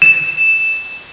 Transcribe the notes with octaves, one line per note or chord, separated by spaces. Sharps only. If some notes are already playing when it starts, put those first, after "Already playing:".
E7